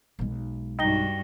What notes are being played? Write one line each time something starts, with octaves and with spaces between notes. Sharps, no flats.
B1 G#3
G2 D#4 F#4 G5 A#6 G7